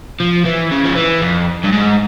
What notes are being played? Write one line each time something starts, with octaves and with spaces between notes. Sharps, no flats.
F3
E3
C#3
F3
E3
F2
G2
G#2